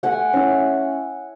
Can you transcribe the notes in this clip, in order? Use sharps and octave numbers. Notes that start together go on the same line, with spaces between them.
A3 F#5 G#5
C#4 E4